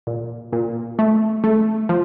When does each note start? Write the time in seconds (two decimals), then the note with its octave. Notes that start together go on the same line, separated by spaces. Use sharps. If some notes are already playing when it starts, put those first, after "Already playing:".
0.07 A#2
0.53 A#2
0.99 A3
1.44 A3
1.89 F3